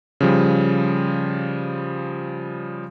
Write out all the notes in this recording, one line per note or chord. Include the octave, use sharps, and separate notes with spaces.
C#3 F3 G3